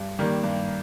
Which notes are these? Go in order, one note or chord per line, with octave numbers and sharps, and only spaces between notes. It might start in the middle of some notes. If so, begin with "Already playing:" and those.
Already playing: G2
D#3 G3 A#3
G2